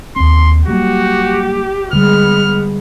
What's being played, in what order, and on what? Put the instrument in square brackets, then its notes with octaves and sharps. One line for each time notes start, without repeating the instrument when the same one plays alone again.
[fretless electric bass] D#2 C4 [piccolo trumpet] C6
[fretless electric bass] F#3 G3 A#3 [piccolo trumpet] F#4 [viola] G4
[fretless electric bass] D3 G3 [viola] G#3 B3 [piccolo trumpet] F6